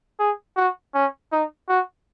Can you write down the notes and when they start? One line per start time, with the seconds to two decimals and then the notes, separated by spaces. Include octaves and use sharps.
0.19 G#4
0.57 F#4
0.94 C#4
1.32 D#4
1.69 F#4